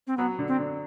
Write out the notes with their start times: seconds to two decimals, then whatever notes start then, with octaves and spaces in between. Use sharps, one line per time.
0.07 C4
0.17 F#3 B3
0.39 D3
0.48 C4
0.59 D3